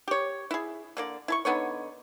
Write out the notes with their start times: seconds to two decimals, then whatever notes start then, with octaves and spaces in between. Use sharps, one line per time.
0.08 G4 C#5
0.51 E4 G#4
0.97 D3 A#3 D5
1.28 E4 A5 C#6
1.45 D3 B3 D#4 C#5